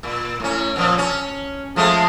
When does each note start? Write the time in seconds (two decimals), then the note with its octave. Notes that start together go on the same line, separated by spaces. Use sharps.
0.03 A#2
0.40 A2 C#4
0.76 A#2 F3
0.98 C#4
1.76 F3 G#3 A3